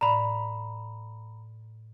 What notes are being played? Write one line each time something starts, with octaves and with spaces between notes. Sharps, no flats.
A2 D5 A#5 B5